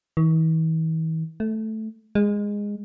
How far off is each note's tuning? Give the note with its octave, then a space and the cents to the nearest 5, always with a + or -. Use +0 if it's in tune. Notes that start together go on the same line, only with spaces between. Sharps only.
E3 -45
A3 -5
G#3 -15